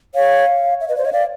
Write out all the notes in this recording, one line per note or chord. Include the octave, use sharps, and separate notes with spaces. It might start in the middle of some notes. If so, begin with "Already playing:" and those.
C#5 F5
E5
B4 D#5
C5 D5
C#5 D#5
D5 F5